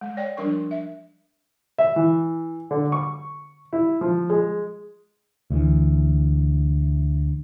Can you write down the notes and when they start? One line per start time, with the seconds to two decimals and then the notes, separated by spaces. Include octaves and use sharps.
0.01 G#3
0.17 C#5 D5 G5
0.37 F3 G3 D4 A#4 C#6
0.71 E5
1.78 E5
1.96 E3
2.71 D3
2.92 C#6
3.73 E4
4.01 F3
4.30 G#3
5.51 D2 E3